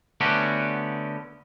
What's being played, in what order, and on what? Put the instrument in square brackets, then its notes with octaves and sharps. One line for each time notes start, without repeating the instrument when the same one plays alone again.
[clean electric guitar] D3 A3 B3 C#4 F#4 G4